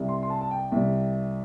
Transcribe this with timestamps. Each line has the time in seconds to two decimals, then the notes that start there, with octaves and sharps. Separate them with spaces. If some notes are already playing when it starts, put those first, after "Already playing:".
Already playing: C2 C3 G3
0.09 C6
0.23 C6
0.30 A5
0.41 A5
0.51 G5
0.72 C2 C3 G3